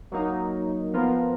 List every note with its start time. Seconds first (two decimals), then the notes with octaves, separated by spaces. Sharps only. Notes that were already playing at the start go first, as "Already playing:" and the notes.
0.12 F#3 A#3 D#4
0.93 F3 B3 F4 A#4